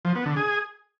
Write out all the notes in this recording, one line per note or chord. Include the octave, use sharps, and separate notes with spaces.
F3
B3
D3
G#4